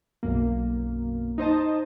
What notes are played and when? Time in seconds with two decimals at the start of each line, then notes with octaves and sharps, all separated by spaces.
0.23 B1 F#2 A#3
1.38 D#4 C5 D#5 A5